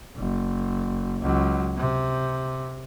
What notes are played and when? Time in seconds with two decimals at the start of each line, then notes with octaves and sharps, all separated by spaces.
0.17 F#1
1.22 C#2 F#3
1.77 C3